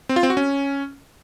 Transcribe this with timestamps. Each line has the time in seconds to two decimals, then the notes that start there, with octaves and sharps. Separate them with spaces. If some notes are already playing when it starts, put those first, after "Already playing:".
0.09 C4
0.16 F4
0.23 C4
0.30 F#4
0.37 C#4